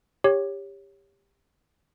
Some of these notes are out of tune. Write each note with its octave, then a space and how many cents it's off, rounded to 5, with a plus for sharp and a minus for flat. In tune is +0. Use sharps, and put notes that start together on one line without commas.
G4 +20 C#5 +0